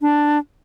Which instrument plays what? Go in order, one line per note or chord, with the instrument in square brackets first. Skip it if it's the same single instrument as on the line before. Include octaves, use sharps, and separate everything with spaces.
[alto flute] D4